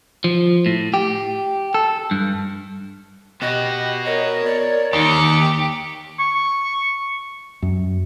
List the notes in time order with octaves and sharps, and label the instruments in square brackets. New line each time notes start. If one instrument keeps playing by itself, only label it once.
[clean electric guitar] F3
A2
G4
A4
G2
[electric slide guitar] B3 F#4 [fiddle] G4 [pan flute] D#5
[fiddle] A#4 C#5 [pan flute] D#5
[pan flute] D5
[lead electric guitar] D#2 [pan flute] D#4 [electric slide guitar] G4 [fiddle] C#6 D6
[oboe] C#6
[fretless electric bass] F#2